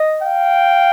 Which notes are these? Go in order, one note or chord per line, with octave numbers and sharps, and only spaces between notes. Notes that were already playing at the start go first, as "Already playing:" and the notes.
Already playing: D#5
F5 G5